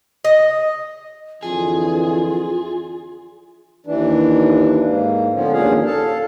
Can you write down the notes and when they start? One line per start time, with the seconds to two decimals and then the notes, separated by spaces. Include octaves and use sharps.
0.25 D#5
1.43 F2 D3 E3 F4 G#4
3.86 D#2 E3 D4
4.83 G#2 A#3
5.34 D3 F3 B3 C#4
5.53 D#2 A#2 C#4 D4 G#4 F5
5.86 A4 F5 A5